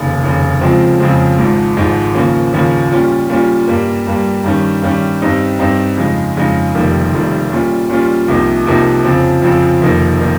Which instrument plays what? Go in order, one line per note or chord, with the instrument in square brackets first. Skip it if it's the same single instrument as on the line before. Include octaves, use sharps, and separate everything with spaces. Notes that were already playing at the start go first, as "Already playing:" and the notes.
Already playing: [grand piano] F1 D#2 C#3
F1 D#2 C#3
F2 C#3 F3 G#3 C4
F2 C#3 F3 G#3 C4
G#1 G#2 F3 G#3
G#1 G#2 F3 G#3
D#2 C#3 F3 A#3 C#4
D#2 C#3 F3 A#3 C#4
A#2 G3 C#4 F4
A#2 G3 C#4 F4
G2 G3 A#3
G2 G3 A#3
G2 D#3 G3 C#4
G2 D#3 G3 C#4
G2 G3 C4 D#4
G2 G3 C4 D#4
F2 C#3 G#3 D#4
F2 C#3 G#3 D#4
F1 F2 D#3 G3 A#3
F1 F2 D#3 G3 A#3
A#2 G3 C#4 F4
A#2 G3 C#4 F4
C2 C3 F3 A#3 D#4
C2 C3 F3 A#3 D#4
F2 C#3 F3 C4
F2 C#3 F3 C4
F1 F2 D#3 A#3 D#4
D#3 A#3 D#4